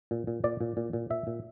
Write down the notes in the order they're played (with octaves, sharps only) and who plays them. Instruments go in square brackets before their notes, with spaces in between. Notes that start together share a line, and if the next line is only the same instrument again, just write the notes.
[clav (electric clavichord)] A#2
A#2
A#2 D5
A#2
A#2
A#2
A#2 E5
A#2